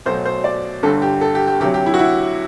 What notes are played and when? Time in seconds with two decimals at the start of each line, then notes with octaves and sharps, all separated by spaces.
0.06 B1 B2 F#3 A3 C5
0.25 C5
0.44 D5
0.83 G1 G2 D3 A4
1.02 G4
1.21 A4
1.35 G4
1.47 G4
1.60 D2 C3 F#3 G4
1.74 G4
1.86 E4
1.94 F#4
1.99 E4